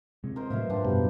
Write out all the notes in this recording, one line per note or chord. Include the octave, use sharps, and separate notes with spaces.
C3 G#3
A#4 C5 D#5
A2 F#3 B4 E5 F5
G#2 F3 D4 G5
F#2 B2 G3